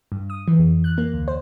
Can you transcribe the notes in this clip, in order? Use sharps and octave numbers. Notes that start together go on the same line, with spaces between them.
G2
D#6
E3
F2
F#6
A#3
D2
C5